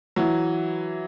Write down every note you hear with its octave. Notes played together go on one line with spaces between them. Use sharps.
E3 F#3